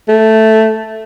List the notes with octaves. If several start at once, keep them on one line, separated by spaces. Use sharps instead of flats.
A3